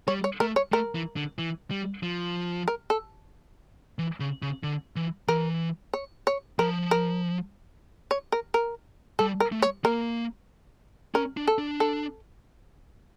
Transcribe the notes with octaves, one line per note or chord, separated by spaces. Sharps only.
G3 C#5
C#5
A3 A#4
C#5
A3 A#4
E3
D3
E3
G3
F3
A#4
A4
E3
C#3
C#3
D3
E3
E3 A#4
C#5
C#5
F3 A#4
A#4
C#5
A#4
A#4
G3 A4
A#4
A3
C#5
A#3 A#4
C#4 A#4
D4
A4
D4
A4